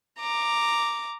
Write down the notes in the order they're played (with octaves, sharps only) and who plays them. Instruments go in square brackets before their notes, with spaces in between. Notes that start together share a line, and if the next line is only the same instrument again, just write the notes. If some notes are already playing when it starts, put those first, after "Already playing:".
[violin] A#5 D6